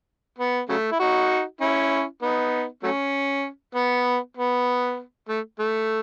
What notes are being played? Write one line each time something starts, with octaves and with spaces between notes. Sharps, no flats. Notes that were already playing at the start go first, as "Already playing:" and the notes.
B3
C#3 F#3 A3
E4
D#4 F#4
C#4 E4
B3 D#4
F#3 A3 C#4
B3
B3
A3
A3